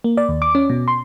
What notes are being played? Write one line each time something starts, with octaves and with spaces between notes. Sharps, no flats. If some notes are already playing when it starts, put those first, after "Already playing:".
A#3
D5
D#2
D6
C#4
B2
C6